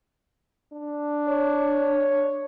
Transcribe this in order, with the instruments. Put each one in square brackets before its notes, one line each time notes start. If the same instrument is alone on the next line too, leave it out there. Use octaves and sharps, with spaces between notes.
[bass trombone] D4
[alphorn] C#5